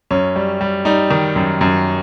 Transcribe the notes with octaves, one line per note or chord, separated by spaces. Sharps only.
F#2 C#4
G3
G3
G3 D#4
D#3
F#2
F#2